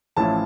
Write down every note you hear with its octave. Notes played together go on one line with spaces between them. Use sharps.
A1 A2 F3 C#4 E4 A5